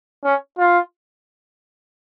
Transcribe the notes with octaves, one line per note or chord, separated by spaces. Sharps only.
C#4
F4